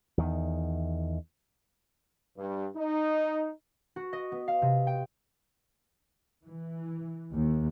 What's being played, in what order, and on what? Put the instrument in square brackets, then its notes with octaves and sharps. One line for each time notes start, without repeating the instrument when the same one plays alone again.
[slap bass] E2 D#3
[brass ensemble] G2
D#4
[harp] F#4
D#5
B3
F5
C3
G5
[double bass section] E3
D#2